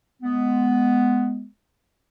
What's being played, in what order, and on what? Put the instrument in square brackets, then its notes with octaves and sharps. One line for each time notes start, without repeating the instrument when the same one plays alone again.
[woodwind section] G#3 B3